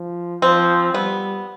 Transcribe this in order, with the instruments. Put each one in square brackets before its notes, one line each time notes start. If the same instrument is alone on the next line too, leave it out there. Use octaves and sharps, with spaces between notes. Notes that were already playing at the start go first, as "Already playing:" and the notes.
Already playing: [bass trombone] F3
[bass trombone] F3 [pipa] C4
[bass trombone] G3 [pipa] B3